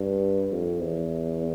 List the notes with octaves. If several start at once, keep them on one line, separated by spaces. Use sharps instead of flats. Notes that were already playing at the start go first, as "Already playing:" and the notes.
Already playing: G2
F2
E2